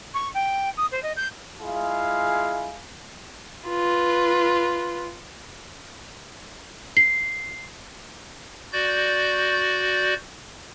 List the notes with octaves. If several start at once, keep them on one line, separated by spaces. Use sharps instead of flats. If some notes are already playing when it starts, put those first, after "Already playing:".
C#6
G5
D#6
C5
D#5
G6
G#3 E4 F4 G#4 F5 G#5
F4 B4
C7
F#4 D5 G6